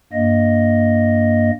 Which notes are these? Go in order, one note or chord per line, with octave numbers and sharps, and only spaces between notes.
G2 A#3 D#5